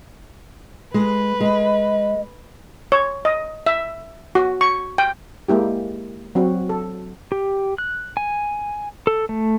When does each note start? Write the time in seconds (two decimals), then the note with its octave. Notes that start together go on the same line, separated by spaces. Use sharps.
0.94 G#3 B4
1.40 G#3 D#5
2.92 C#5
3.25 D#5
3.66 E5
4.35 F#4
4.61 C#6
4.98 G5
5.48 G#3 A#3 E4 G4
6.35 F#3 C4 F#4
6.69 A4
7.32 G4
7.78 F#6
8.17 G#5
9.07 A4
9.29 A3